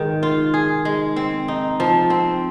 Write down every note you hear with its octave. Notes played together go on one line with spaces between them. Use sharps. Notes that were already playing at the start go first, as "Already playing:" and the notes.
Already playing: G#2 D#3
F4
G#4
G#3
C4
D#4
F3
C4